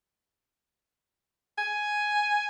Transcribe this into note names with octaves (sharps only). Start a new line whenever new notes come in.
G#5